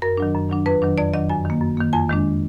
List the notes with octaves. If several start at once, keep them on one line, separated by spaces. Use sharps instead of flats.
F#2 A#4
D#3 F#3 D4
F#2
D#3 F#3 D4
F2 B4
D#3 F#3 D4
F2 D5
D#3 F#3 D4 D#5
F#2 G#5
D#3 A#3
F#2
D#3 A#3
F2 G#5
D#3 G#3 D4